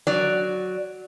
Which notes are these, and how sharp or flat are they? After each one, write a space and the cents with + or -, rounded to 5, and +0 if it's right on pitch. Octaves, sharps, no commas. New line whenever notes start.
F#3 +0 D5 +0